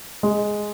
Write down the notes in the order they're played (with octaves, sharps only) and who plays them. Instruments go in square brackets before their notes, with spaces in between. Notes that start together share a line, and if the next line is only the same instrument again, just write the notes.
[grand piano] G#3